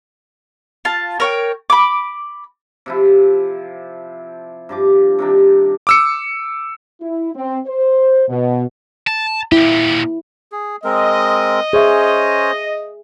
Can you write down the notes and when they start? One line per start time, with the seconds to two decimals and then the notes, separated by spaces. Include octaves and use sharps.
0.85 F4 A5
1.20 A#4 C#5 G5
1.70 B5 D6
2.86 C3 F3 E4
4.69 G2 F3 D6
5.19 C3 D#3 D4
5.87 D6 E6 C#7
7.01 E4
7.34 C4
7.67 C5
8.29 B2
9.07 A5
9.52 A#2 E4 G4
10.52 G#4
10.84 G#3 C4 A#4 D#5
11.73 C#4 G#4 C5 C#5 E5